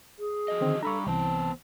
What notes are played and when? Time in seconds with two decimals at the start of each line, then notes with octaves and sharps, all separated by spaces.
0.19 G#4
0.48 F3 F#4 D#5
0.61 D3 D#3 C4
0.83 G3 G#3 D4 A4 A#5 B5 C#6
1.06 C2 E3 B3 C4 C5 A5